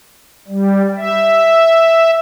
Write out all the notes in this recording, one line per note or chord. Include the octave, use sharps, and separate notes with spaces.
G3
E5